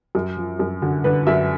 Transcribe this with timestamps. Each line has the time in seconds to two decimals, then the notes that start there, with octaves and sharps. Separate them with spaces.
0.15 F#2
0.37 F3
0.59 F#2
0.82 D3 F#4
1.04 D3 B4
1.27 F#2 E5